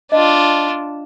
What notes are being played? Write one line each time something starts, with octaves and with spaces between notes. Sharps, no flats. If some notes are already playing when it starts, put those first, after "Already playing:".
D4 F4 D#5